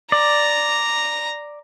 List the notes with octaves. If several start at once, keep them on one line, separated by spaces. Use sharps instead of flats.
D5 A#5